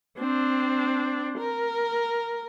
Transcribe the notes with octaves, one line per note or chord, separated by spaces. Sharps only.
C4 D4
A#4